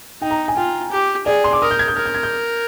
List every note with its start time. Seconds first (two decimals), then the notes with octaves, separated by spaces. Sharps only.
0.22 D#4 G5
0.31 A#5
0.48 G#5
0.57 F4 G5
0.91 G4
1.26 G#4 D5
1.44 C6
1.53 D6
1.62 A#4 D#6
1.71 G6
1.79 G#6
1.88 G6
1.96 A#4 F6
2.06 G6
2.14 G#6
2.23 G6